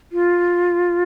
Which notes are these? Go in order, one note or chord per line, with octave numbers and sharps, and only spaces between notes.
F4